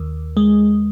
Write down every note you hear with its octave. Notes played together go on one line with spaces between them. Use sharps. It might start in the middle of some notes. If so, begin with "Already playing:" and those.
Already playing: D#2
G#3